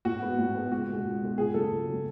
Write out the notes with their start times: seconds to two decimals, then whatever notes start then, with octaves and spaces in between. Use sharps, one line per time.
0.05 A2 F#4
0.22 G#3 B3
0.38 A2
0.55 G#3 B3
0.72 C#2 F#4
0.88 B2 G#3
1.05 C#2
1.21 B2 G#3
1.37 C#2 G#4
1.54 C#3 F#3 A3 A4
1.70 C#2
1.87 C#3 F#3 A3